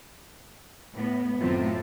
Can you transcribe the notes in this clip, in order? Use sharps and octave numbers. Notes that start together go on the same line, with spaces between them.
A2 B3
F#2 A2 D#3 A3 C4 F4